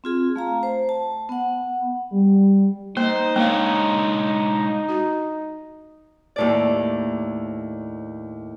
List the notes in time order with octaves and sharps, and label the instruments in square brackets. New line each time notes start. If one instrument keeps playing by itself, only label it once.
[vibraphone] C4 F4 G#4
A3 F5 A#5
C5
A5
B3 F#5
[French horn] G3
[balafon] A#3 [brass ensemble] D#4 [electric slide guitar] C5
[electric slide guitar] G#3 D4 C#5 [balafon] A#3 F5
[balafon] F#4
[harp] D#2 A2 D5